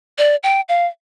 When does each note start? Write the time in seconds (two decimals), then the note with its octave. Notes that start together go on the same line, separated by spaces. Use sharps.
0.18 D5
0.43 G5
0.69 F5